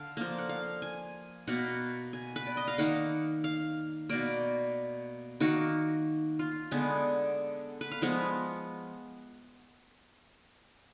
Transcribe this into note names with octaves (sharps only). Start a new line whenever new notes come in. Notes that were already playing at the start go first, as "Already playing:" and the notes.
Already playing: D3 F5
F3 A#3
F#5
F5
G#5
B2 A#3 F#5
G#5
B4
D5
D#5
F5
D#3 A#3 F#5
F5
B2 A#3 D5
D#3 A#3 F#4
F4
D3 G#3 B3 G#4
B4
F5
F3 G#3 B3 F#5